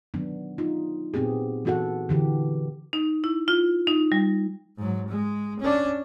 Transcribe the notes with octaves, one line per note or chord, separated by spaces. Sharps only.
D#3 F#3 B3 D4
D#4 F4
A#2 B3 C4 G4 G#4
E3 B3 F#4 A4 F#5
D3 E3 G4
D#4
E4
F4
D#4
G3
G#2 F#3
G#3
C#4 D4